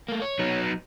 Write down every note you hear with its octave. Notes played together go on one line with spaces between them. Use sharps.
A3 A#3
C#5
F#3 B3 D#4